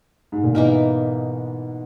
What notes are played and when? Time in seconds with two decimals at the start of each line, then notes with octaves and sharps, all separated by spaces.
0.32 G#2
0.44 A#2
0.55 G#2 B2 E3 A#3 D#4 A#4